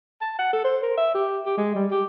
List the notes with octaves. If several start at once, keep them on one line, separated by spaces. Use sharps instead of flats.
A5
F#5
A4
C5
A#4
E5
G4
G4
G#3
G3
G4